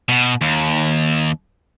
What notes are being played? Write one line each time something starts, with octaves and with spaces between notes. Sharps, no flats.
B2
D#2